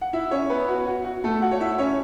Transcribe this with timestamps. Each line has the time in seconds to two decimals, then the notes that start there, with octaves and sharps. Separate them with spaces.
0.01 F#5
0.13 E4 E5
0.31 C#4 C#5
0.50 B3 B4
0.68 F#4
0.87 F#4
1.05 F#4
1.24 A3 A4
1.42 F#4 F#5
1.51 C#5
1.61 E4 E5
1.78 C#4 C#5